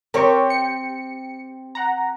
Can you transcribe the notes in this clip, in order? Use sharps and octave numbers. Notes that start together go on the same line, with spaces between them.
C4 G4 A#4 C#5 C#6
C#7
F#5 A#5